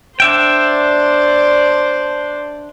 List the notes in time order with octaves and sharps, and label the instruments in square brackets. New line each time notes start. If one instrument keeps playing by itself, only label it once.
[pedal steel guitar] D4 E5 G5 [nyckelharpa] C5 D5